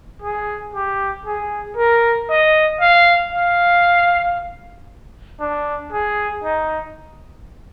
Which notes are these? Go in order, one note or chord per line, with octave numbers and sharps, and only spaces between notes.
G#4
G4
G#4
A#4
D#5
F5
F5
D4
G#4
D#4